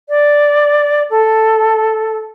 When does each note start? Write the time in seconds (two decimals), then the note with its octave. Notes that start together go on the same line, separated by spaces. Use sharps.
0.09 D5
1.10 A4